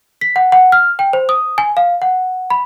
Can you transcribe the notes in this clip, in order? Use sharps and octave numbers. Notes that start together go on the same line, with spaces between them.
B6
F#5
F#5
F6
G5
C5
D#6
G#5
F5
F#5
B5